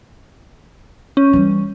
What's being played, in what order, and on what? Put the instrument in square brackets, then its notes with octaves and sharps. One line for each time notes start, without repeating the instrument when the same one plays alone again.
[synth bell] C#4
[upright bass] E3 G3